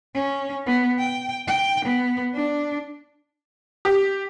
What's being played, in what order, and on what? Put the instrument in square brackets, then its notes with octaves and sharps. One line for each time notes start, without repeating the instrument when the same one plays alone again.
[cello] C#4
B3
G5
G5
B3
D4
[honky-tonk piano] G4